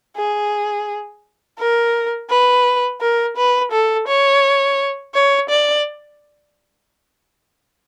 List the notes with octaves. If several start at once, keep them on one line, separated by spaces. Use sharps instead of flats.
G#4
A#4
B4
A#4
B4
A4
C#5
C#5
D5